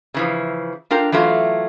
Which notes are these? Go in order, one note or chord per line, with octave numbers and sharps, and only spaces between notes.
C#3 E3 F3
D4 F4 A#4 G5
E3 F#3 A3 F4